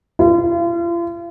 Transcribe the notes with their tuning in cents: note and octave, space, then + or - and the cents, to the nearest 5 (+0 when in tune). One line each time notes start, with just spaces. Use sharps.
F4 -40